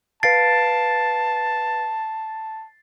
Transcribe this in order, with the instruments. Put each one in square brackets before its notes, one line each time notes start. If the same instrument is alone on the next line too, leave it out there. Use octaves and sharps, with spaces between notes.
[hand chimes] B4 F5 D7 [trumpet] A5 [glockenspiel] A6 C7